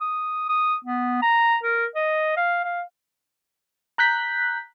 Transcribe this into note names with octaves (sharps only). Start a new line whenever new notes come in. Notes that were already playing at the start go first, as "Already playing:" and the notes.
D#6
D#6
B3
A#5
A#4
D#5
F5
F5
A#5 F#6 G6 B6